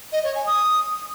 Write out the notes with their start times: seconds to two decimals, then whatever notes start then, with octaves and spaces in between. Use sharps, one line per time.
0.12 D#5
0.24 C#5
0.35 G#5
0.46 D#6